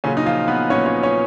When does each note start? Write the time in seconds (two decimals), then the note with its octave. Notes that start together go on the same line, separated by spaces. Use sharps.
0.04 A#2 C#3 F#3 C#4
0.17 D#4
0.26 F3 F4
0.48 B3 B4
0.70 A#2 F#3 C#4 C#5
0.86 C#4 C#5
1.03 C#4 C#5